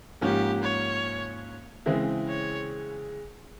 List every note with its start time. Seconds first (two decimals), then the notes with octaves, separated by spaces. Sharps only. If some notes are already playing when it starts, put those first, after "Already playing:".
0.21 G#2 F3 A#3 C#4 G4
0.62 C#5
1.86 C#3 E3 G#3 C4 E4
2.28 C#5